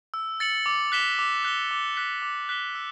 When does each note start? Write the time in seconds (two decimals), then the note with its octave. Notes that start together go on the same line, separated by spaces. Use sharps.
0.14 E6
0.40 A6 C#7 F#7
0.66 D6
0.92 F#6 B6 E7 G7
1.19 D6
1.45 F#6 B6 E7 G7
1.71 D6
1.97 F#6 B6 E7 G7
2.22 D6
2.49 F#6 B6 E7 G7
2.75 E6